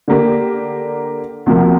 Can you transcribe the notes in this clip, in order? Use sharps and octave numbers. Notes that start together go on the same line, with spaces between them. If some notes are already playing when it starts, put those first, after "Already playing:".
D3 A#3 G4
D2 C3 F3 A#3